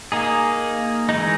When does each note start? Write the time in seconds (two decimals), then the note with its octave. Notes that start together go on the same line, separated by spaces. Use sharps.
0.12 A#3 D#4 G#4
1.09 E3 G#3 D#4